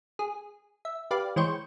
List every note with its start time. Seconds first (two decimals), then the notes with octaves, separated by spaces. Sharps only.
0.19 G#4
0.85 E5
1.11 G4 B4 D5 F5
1.36 E3 G#3 C5 C#5 G5 C#7